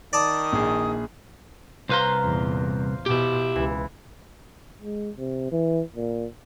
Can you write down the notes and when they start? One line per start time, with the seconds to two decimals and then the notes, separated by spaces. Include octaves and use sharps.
0.13 D#3 D5 A5 D#6
0.53 A#1 G#4
1.89 C2 B4 C5 F5 A#5 C6
2.23 E2 A#2
3.06 B2 E4 G4
3.56 C#2 E3
4.82 G#3
5.17 C3
5.52 E3
5.96 A#2